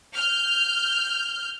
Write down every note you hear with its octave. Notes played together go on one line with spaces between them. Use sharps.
F6 G6